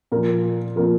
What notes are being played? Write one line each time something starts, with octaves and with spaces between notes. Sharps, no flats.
A#2 F3 A#4
A#2 F3 A#4